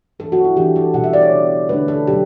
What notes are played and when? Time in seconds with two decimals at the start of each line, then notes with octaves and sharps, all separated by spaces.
0.19 E3 B3 D4 A4
0.32 F#4
0.44 E4
0.56 E3 B3 D4 G4
0.76 A4
0.94 B2 G3 C#4 F#5
1.04 E5
1.13 D5
1.22 C#5
1.31 C#3 E3 B3 D4
1.69 D3 A3 D4 B4
1.88 A4
2.07 B2 F#3 C#4 G4